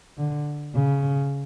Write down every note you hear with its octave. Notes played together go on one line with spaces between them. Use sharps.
D3
C#3